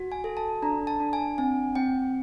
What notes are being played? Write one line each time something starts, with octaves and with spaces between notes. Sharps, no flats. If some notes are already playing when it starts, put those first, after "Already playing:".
Already playing: F#4
G#5
A4
A5
D4 A#5
A5
D4
G#5
C4 G#5
C4 G5